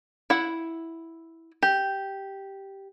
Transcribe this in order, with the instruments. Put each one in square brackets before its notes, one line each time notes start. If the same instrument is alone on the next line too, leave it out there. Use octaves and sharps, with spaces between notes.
[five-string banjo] E4 F#5
G4